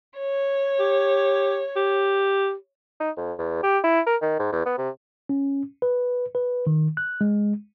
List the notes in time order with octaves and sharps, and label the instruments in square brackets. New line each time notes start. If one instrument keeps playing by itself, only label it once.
[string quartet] C#5
[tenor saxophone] G4
G4
[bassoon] D#4
F2
E2
G4
E4
A#4
D#3
G#2
E2
B3
C3
[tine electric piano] C#4
B4
B4
D#3
F#6
G#3